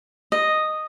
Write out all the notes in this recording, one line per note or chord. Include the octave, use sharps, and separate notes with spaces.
D#5